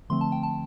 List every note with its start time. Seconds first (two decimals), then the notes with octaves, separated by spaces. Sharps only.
0.10 D3 F3 A3 C4 C6
0.21 A5
0.32 G5
0.43 A5